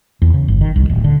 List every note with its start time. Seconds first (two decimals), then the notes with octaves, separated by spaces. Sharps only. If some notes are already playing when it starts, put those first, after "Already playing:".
0.22 E2
0.34 C#3
0.48 G1
0.61 D#3
0.76 C2
0.89 D1
1.04 D3